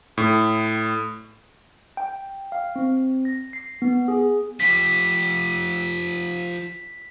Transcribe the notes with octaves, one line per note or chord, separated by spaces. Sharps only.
A2
G5
F5
C4
A#6
C7
B3
G#4
F3 G4 B6